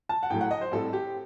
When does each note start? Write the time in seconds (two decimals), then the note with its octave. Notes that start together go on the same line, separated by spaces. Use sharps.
0.09 A5
0.23 F#5
0.30 A2 F#3 A3 G5
0.41 F#5
0.51 D#5
0.61 C5
0.72 A2 G3 C4 A4
0.93 G4